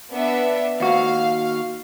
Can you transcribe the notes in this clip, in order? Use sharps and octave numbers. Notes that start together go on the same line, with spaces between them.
B3 D4 E5
D#2 F#4 F5